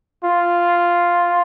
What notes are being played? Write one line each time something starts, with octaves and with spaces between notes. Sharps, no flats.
F4